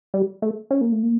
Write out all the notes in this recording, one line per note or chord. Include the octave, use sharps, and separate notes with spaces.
G3
A3
C#4
A#3
A3
A#3